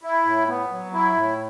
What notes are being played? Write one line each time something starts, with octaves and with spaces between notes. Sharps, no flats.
E4
A2
B3
F#3
E4
A2